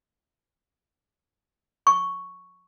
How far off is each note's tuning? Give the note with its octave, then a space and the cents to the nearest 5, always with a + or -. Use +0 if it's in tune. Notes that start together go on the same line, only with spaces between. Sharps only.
C#6 +0